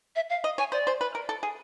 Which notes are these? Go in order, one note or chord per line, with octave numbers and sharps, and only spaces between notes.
E5
F5
D#5
C#5 G#5
C5 D5
C5
B4
A#4
A4
G#4